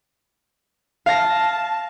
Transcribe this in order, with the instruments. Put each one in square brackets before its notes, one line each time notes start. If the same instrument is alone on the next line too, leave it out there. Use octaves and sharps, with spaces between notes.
[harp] F5 A#6 [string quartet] A5